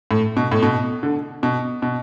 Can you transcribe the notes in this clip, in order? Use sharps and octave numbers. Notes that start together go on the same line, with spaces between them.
A2
B2
A2
B2
D3
B2
B2